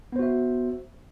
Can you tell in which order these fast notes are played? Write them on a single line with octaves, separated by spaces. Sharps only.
B3 C5 F#4 E5